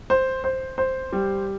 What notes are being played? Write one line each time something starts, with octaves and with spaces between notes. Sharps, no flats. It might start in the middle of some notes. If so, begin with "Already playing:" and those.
C5
C5
C5
G3